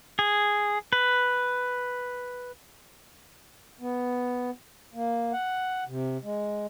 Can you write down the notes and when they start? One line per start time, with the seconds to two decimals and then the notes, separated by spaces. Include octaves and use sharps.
0.19 G#4
0.93 B4
3.80 B3
4.94 A#3
5.33 F#5
5.87 C3
6.23 G#3